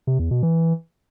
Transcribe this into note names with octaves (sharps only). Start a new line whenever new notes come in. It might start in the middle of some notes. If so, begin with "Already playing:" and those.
C3
E2
B2
E3